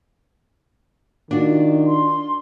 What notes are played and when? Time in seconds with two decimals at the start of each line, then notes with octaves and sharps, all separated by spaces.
1.31 D#3 D4 F4 F#4
1.87 C6